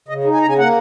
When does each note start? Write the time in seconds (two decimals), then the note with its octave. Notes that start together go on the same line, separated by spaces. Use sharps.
0.08 C#3 D#5
0.24 D#4 G#4
0.34 G#5
0.41 C#3 A#5
0.49 G#5
0.58 A#3 F#5